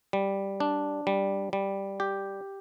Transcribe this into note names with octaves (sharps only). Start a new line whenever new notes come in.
G3
D4
G3
G3
G4